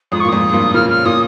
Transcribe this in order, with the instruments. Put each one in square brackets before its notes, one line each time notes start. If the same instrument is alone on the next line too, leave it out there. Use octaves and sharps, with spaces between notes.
[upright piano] F2 G#2 [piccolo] D#6
[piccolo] C#6
[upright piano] A#2
[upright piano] F2 G#2 [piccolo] D#6
[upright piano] G#2
G2 A#2
[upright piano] A#2 C#3 [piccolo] F6
[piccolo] F6
[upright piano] A#2 [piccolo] D#6